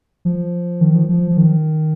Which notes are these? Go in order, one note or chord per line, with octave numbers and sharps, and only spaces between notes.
F3
D#3
F3
F3
F3
D#3